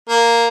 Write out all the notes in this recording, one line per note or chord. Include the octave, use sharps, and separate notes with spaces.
A#3